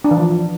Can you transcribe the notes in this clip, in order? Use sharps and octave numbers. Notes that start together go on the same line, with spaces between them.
D4
E3
F3